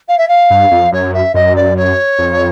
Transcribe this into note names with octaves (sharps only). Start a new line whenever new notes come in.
F5
E5
F5
G2
F2
F#2 C#5
E5
F#2 D#5
D5
C#5
F2